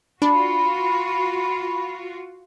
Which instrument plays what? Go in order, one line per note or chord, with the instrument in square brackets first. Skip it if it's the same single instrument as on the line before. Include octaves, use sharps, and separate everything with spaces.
[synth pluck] D4 [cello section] F4 F#4 [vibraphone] B5